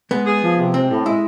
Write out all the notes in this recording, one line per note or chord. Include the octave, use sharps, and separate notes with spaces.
G#3 B3
G#4
F3
C3
G#3 C4
A2
G#3 E4